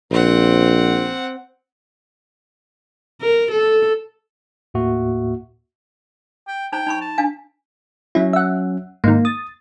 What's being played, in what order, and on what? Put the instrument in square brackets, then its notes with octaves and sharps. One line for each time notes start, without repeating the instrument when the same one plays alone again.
[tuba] A#1 [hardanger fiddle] C4 F#5
[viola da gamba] A#4
A4
[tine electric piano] D#2 A2 A#3 F#4 E5
[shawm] G5
[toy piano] D#4 C5 A#5 [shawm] G5
[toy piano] D#4 B5 C#6
[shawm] A5
[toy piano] D4 F5 G#5
[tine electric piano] F#3 C#4 [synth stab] E4
[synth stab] E5 F#5
[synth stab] G#2 D#3 [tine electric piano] A#3
[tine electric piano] D#6 [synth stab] A6